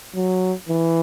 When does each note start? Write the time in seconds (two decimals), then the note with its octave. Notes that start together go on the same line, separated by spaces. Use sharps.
0.15 F#3
0.69 E3